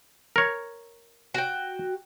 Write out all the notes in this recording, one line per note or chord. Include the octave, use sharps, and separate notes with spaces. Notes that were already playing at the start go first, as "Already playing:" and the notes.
A#4 C#5
F#4 G5